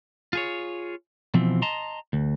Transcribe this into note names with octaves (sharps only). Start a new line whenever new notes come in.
F4 G#4 C#5
B2 E3 F3 C4
D#5 A5 A#5 C6
D2